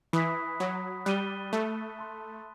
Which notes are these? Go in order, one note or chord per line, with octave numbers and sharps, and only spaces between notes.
E3 B5 D#6 F#6 B6
F#3
G3 F#6 A6 D#7 G7
A3
A5 C6 F#6